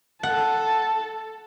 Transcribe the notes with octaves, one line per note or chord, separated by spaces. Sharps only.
A4 F#5 A5